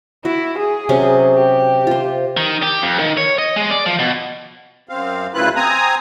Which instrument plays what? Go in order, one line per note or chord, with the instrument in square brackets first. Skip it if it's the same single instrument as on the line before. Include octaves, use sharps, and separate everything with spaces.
[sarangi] E4 [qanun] F#4
[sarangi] G#4
[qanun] C3 F#3 C#4
[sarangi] G4
[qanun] F4 C5
[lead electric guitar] D#3
G4
F2
D#3
C#5
D#5
G#3
D5
F3
B2
[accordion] F#2 C4 F5
D2 C#3 E4 F4 B4 F#6
C4 G#5 A#5 D#6